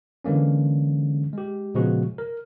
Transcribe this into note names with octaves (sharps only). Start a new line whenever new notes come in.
D3 E3 G#3 A#3 C#4
G#3 G4
A#2 C#3 F3 G#3 B3 F#4
A#4